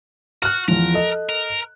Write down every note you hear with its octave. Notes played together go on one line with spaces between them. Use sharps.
F#4 F6 F#6
E2 F3 A#4
A4 D#5
A#4